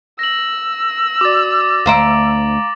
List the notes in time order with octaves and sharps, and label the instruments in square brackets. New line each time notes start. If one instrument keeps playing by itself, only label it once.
[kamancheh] E6 [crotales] A#6 F#7
[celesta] F#4 D5 [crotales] D6 A6
[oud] D2 C5 E5 [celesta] F5 A#5 D7